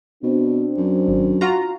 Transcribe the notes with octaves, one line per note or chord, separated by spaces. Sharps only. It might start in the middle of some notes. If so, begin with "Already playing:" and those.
B2 C4 D4
F#2
G#1
F4 F#4 A#5